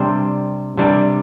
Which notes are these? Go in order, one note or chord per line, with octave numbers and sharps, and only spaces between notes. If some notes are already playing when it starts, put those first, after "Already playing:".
Already playing: C3 G3 D4 C5
C3 G3 D4